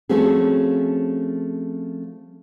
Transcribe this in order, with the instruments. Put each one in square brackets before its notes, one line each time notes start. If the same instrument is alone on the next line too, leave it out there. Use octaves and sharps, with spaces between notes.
[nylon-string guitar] F3 A3 C4 C#4 F#4 G#4